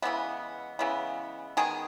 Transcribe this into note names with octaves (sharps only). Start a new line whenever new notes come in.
C#3 E3 G#3 B3
C#3 E3 G#3 B3
D#3 G#3 B3 G#4